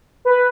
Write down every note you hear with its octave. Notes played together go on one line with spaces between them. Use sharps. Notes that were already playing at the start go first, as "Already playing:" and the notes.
B4